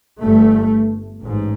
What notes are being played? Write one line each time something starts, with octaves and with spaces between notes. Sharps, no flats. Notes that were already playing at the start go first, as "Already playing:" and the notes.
G1 G2 A3
A1 G#2